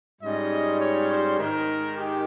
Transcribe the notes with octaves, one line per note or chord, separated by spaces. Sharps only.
G#2 G3 C#4 F4 D#5
C#5
C5
G#2 D#3 G#3 D#4 A#4
G4